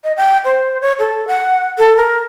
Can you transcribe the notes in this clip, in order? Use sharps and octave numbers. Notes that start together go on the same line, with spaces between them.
D#5
G5
C5
C#5
A4
F#5
A4
A#4